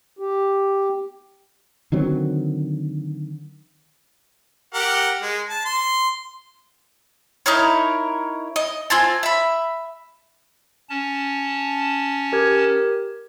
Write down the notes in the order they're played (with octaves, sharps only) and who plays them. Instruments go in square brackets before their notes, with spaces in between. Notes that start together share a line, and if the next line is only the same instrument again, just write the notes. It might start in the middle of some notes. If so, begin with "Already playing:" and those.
[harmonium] G4
[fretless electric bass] D3 D#3 F#3 C4
[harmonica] G4 A#4 F#5
G#3
A5
C6
[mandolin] D#4 E4 A#4 C#5
D#5
C4 F4 G#5 A5
E5 B5
[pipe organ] C#4 A5
[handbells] G4 A#4 G#6